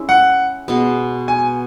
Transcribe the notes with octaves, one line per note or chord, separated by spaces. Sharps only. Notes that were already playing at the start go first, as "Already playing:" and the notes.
Already playing: G#3 C#4 E4
F#5
B2 G#3 B3
G#5